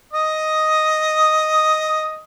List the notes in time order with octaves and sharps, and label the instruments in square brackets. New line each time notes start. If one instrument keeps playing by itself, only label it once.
[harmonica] D#5 D#6